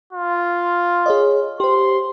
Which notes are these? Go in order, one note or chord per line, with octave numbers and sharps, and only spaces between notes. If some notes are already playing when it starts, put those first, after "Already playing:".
F4
G#4 C#5 D#5
G4 C5 C6